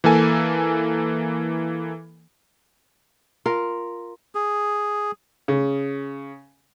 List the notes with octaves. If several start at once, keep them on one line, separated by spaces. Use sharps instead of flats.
E3 A#3 A4 G#5
F4 A#4
G#4
C#3